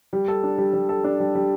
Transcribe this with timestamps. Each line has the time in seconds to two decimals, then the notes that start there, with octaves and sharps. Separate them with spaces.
0.13 G3
0.28 A4
0.43 D4
0.58 G3
0.73 G3
0.89 A4
1.04 D4
1.20 G3
1.35 G3